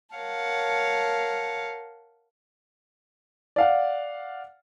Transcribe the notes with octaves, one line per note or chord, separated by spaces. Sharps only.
A#4 C#5 F5 F#5 A5
D5 F5 F#5